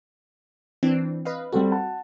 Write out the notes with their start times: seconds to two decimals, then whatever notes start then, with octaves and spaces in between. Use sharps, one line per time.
0.83 E3 C4 D4
1.25 B4 D#5 F5
1.52 G3 C4 F#4 A4
1.72 F#5 A5